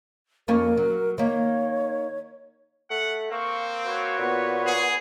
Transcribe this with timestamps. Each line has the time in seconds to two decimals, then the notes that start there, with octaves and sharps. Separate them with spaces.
0.48 F2 A#3 C#4 A#4
0.77 F#3
1.18 D#3 A#3 C#5
2.90 A3 F#5
3.31 A#3 C4 F5 C#6
3.86 F#4 B4 C#5
4.19 A#2 B3
4.66 G#4